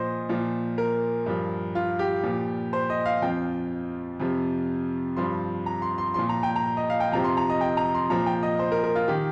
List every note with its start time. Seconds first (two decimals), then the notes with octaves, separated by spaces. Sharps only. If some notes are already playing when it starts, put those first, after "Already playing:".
Already playing: A#2 F3 C5 D#5
0.29 A#2 F3
0.78 A#4
1.26 G2 F3
1.75 F4
1.99 G4
2.23 A#2 F3
2.73 C5
2.90 D#5
3.06 F5
3.22 F2 F3 G5
4.20 F2 C3 F3
5.17 G2 F3 C6
5.66 A#5
5.82 C6
5.98 C6
6.14 A#2 F3 C6
6.29 A#5
6.43 G5
6.56 A#5
6.77 D#5
6.90 F5
7.00 G5
7.12 F2 C3 F3 A#5
7.24 C6
7.37 A#5
7.50 D#5
7.61 G5
7.77 A#5
7.95 C6
8.10 A#2 F3 A#5
8.26 G5
8.43 D#5
8.59 C5
8.72 A#4
8.84 A#4
8.96 F4
9.08 D#3 G4